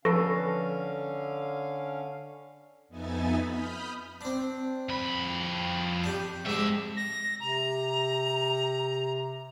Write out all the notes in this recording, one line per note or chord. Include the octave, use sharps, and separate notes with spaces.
D3 F3 C#4 A4 B4 F5
F2 B3 D#4 E5 G#5 A6
B5 D#6 F6 G6
C4 D4
F2 B5
D4 G4
F2 G#2 D4 E5
A#6
C3 A#5